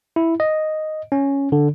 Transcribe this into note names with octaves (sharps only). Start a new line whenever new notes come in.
E4
D#5
C#4
D3